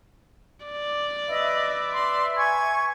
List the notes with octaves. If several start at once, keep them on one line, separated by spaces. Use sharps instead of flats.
D5
B4 D#5 E5
C6
G#5 C#6 G#6